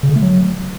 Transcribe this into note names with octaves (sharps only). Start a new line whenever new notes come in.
C#3
D3
A3
F#3